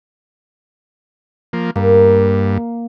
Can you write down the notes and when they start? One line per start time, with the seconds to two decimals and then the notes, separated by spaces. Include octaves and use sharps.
1.53 F3 A#3
1.76 G2 A#3